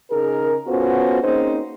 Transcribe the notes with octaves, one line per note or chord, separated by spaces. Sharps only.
C#3 D#4 G#4 A#4
B3 C#4 F4 F#4 A4 C5
A#3 C4 C#4 D#4 G#4 C5